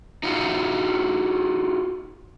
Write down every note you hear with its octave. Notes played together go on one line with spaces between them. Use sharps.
D#4 F4 F#4